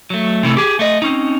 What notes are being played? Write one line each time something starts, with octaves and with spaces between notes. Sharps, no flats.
F#3 A3
C3 E3 A3
G4 G#4
A3 D#5
C4 C#4 D#4